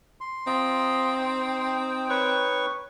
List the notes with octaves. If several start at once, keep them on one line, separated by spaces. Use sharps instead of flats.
C6
C4 F4 D#5 A#5
D#4 G5
B4 C#5 C#6